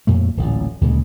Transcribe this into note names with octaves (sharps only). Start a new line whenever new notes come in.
F2 A#2 A3
D1 A1 A#2
D2 A#2 C#3 G#3